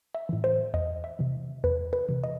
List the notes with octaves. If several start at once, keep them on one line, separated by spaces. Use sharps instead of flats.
E5
A2 E3
C5
E2 D#5
E5
C3 E3
E2 B4
B4
C3 E3
D#5